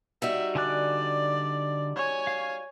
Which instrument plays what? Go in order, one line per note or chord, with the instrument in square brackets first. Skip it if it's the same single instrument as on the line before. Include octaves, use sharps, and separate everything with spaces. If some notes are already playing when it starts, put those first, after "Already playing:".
[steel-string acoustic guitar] G3 D#4 F#4 [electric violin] E5
[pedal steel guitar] D3 G#5 F#6 [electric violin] D5
[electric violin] C#5 G#5
[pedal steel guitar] F5